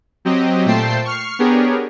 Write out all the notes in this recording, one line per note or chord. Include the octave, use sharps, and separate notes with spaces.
F#3 C4 G4 D#5
A#2 A3 C5 G5 A5 C7
C#6 F6 C7
B3 D4 G4 G#4 A#4 C#5